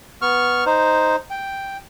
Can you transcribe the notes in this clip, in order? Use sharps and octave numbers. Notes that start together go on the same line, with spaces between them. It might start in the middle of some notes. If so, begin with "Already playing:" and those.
B3 C#6 F6
D#4 C5
G5